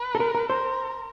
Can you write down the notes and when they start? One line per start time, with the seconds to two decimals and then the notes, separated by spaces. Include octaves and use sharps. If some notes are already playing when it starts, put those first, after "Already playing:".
Already playing: B4
0.15 A4
0.20 A#4
0.35 A#4
0.49 A#4 C5